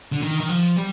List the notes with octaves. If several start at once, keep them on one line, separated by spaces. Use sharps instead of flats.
D3
D#3
D#3
F3
G3